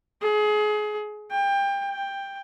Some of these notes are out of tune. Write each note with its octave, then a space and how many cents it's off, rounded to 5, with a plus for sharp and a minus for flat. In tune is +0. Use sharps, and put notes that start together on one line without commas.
G#4 +30
G5 +25
G5 +10